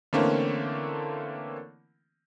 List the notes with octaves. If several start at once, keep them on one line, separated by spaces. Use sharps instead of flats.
D3 E3 A3 A#3 C4 C#4